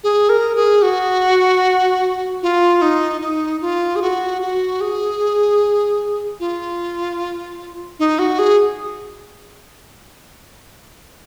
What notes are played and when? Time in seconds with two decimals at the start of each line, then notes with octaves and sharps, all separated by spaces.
0.04 G#4
0.29 A#4
0.56 G#4
0.82 F#4
2.43 F4
2.82 D#4
3.21 D#4
3.61 F4
3.96 G#4
4.02 F#4
4.42 F#4
4.81 G#4
6.40 F4
7.99 D#4
8.19 F#4
8.39 G#4